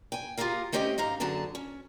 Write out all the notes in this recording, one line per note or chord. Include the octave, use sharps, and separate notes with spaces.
G5 G#5
F4 G4 G#4 A#4 F5
A3 C4 C#4 G4 D#5 G5
G#2 D#4 F5 A#5
F#2 D3 F#3 G#4 A5
C#4